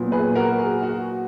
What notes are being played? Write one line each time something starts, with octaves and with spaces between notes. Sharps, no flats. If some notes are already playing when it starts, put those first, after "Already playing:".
Already playing: A#2 F#3 B3
G#4 B4
F#4 A#4
G#4
F#4